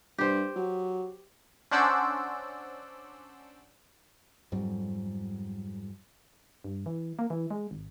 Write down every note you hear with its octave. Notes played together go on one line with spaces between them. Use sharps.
G2 G4 C5
F#3
C#4 D4 C5 D5 F#5 E6
F2 G#2 F#3 G3
G2
E3
A#3
E3
G#3
G#1